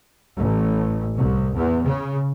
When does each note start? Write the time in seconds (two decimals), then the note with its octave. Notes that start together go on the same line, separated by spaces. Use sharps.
0.36 A1
1.15 C2
1.54 E2
1.84 C#3